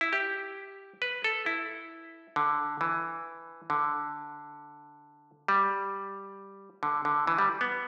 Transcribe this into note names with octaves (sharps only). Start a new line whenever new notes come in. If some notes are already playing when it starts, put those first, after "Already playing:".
E4
G4
B4
A4
E4
D3
E3
D3
G3
D3
D3
E3
G3
B3